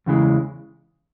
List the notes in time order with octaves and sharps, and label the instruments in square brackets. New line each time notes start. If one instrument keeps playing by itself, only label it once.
[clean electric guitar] E2 C#3 E3 G#3